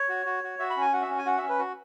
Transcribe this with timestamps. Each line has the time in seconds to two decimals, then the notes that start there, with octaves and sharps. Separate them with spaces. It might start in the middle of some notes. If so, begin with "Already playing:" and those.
Already playing: C#5
0.09 F#4
0.26 F#4
0.44 F#4
0.59 F#4 E5
0.70 B5
0.77 C#4 G#5
0.93 F#4 F#5
1.02 E5
1.10 C#4
1.18 G#5
1.26 F#4 F#5
1.38 C#4 E5
1.49 B4
1.59 F#4